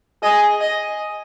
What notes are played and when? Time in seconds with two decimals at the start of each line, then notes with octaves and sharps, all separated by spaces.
0.23 G#4 D#5
0.61 D#5